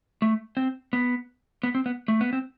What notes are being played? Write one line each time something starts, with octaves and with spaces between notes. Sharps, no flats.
A3
C4
B3
B3
C4
B3
A3
B3
C4